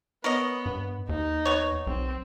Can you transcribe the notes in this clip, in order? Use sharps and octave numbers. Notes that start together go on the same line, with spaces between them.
B3 A#4 C#5 D#5
G2
D#2 D#4
B3 C#5
B1 C4